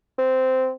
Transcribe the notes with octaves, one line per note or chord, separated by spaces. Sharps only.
C4